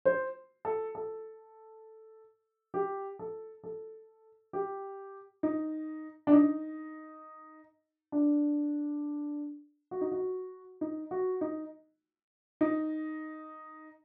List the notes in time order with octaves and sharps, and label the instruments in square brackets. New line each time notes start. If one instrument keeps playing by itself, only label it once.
[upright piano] C5
A4
A4
G4
A4
A4
G4
D#4
D4
D#4
D4
F#4
D#4
F#4
D#4
F#4
D#4
D#4